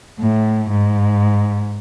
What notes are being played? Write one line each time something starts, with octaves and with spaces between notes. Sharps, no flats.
A2
G#2